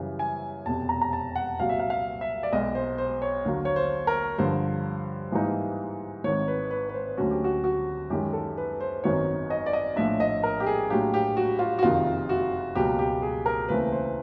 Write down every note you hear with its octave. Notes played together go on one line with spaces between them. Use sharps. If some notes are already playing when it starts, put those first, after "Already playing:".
Already playing: F#2 C#3 E3 G3
G#5
F1 E2 B2 A5
A#5
A#5
A5
F#5
C2 A#2 F#3 A#3 F5
E5
F5
F5
E5
D5
B1 B2 G#3 D#5
C5
C5
C#5
D#2 D3 F#3 A#3
C#5
C5
A#4
G2 D3 F3 C5
G#2 E3 G3 A#3 D#4
G#1 G#2 D#3 C#5
B4
B4
B4
C5
D2 D3 F#3 A3 C#4 F#4
G4
F#4
F#4
F#2 D#3 G#3 G4
A4
B4
C5
G#1 F#2 D#3 F#3 B3 C#5
D#5
D5
D#5
A#1 A2 F3 A3 D4 E5
D#5
A#4
G4
G#4
A2 F#3 A#3 D4 G4
G4
F#4
F4
F#4
F#1 F2 C3 D#3 F4
F#4
C#2 B2 F#3 A#3 G4
G4
G#4
A#4
D#2 C#3 E3 A3 C4 B4
C5